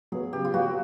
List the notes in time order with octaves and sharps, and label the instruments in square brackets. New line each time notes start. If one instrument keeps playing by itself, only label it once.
[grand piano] F#3 B3 [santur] G#4
[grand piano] C#3 [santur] G4
[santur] F4
[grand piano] F#3 B3 [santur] F#4